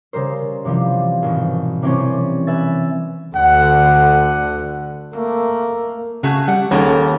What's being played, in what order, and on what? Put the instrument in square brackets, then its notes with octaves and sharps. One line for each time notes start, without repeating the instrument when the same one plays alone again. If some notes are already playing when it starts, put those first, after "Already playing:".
[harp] C#3 G3 A#4 C5
C3 E3 F3 G3
G#1 B2
C3 E3 G3 C4 C#4
B4 E5 G#5 A6
[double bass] D2 D3 [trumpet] F#5
[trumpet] A3 [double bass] A#3
[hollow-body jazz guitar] C#3 [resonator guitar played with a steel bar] A3 F#4 G#4
[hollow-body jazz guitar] G3 [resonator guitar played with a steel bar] F#5
[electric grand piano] D#2 [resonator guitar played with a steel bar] C#3 A#3 B3 [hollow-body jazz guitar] C#4 A4